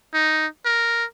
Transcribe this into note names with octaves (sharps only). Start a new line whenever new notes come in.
D#4
A#4